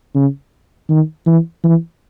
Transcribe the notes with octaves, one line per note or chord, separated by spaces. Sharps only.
C#3
D#3
E3
E3